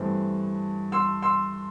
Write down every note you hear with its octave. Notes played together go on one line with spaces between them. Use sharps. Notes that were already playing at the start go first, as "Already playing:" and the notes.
Already playing: G2 E3 A3 C4
C6 E6
C6 E6